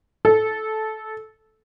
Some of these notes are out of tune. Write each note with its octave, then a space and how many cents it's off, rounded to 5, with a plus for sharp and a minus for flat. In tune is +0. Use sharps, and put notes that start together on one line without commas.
A4 -15